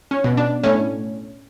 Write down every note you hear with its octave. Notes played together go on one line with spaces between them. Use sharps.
C#4
B2
D4
A2 C#4